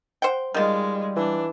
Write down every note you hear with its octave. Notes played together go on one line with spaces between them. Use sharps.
C5 F#5 G5
D#3 G3 G#3 F4
E3 D4